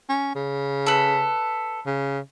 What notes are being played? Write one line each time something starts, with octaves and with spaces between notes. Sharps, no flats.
C#4
C#3
A4 B4
C#3